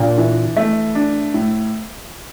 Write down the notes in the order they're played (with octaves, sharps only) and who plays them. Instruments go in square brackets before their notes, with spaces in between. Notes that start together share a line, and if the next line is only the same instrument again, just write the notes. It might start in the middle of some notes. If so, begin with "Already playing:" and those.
Already playing: [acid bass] A#2 [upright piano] D4
[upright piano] E3
A3
D4
A2